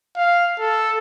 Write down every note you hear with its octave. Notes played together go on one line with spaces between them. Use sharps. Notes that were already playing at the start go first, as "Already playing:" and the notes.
F5
A4